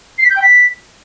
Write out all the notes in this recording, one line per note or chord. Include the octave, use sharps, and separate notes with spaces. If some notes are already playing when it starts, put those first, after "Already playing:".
C7
B6
G6
G5
B6